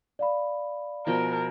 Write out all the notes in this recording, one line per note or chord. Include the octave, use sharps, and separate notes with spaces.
D5 F5 B5
B2 F3 A#4 G5